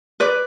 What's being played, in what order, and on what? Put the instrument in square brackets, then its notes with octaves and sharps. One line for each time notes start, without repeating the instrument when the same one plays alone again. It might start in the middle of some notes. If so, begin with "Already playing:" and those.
[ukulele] B4 D5